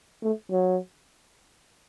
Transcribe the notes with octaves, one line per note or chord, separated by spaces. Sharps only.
A3
F#3